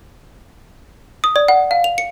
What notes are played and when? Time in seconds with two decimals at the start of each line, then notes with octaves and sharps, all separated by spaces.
1.24 D#6
1.36 D5
1.48 F#5
1.71 F5
1.84 F7
1.98 C#7